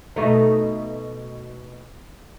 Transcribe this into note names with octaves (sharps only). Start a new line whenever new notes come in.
B2 A3 D#4